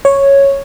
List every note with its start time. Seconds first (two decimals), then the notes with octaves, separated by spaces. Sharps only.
0.05 C#5